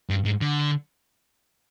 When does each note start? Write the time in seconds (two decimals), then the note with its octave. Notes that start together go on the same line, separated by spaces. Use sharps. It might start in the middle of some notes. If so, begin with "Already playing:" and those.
0.10 G2
0.25 G#2
0.41 D3